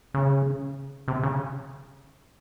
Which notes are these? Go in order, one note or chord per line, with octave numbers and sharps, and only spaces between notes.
C#3
C3
C#3